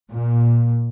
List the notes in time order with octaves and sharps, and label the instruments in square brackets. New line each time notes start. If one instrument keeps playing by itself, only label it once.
[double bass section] A#2